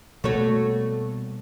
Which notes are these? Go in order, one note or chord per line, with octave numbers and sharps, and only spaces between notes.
B2 G3 A3 A#3 F#4 C#5